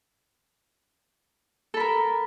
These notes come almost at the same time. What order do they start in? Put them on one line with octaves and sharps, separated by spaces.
A4 B5 A#4